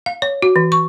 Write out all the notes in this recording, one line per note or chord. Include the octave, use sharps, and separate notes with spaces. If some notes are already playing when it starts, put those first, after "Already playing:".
F5
C#5
F#4
E3
C#6